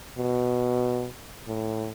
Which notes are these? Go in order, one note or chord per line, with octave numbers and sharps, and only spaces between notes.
B2
A2